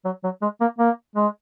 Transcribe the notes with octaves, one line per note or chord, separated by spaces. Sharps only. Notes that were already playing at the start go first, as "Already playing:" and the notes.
F#3
F#3
G#3
A#3
A#3
G#3